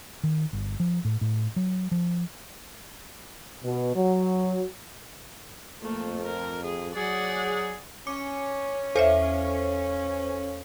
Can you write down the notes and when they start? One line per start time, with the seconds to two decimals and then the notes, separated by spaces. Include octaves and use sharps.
0.23 D#3
0.53 G1
0.80 F3
1.05 A2
1.21 A2
1.56 F#3
1.91 F3
3.64 B2
3.95 F#3
5.82 F2 A3 A#3
6.23 A#4
6.65 G#4
6.95 F#3 G#4 D5 F#5
8.07 C#4 D6 C#7
8.95 E2 A4 C5 C#5 E5 F5